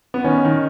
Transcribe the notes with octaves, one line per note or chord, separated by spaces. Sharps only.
B3
D#3 C#4
D#3